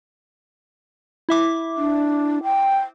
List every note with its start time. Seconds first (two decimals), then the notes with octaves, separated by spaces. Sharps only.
1.29 E4 E5 D6
1.77 D4
2.44 G5